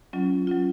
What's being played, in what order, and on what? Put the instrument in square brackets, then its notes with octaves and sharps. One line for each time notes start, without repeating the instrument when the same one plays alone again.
[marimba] F#3 C#4 F4
F#3 C#4 F4